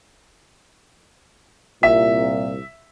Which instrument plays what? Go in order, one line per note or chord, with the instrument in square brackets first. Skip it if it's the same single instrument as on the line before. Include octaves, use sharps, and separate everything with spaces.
[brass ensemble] C2 A#2 [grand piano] E5